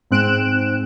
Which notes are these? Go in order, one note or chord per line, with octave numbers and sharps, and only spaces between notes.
G#2 C4 F#6 D7 E7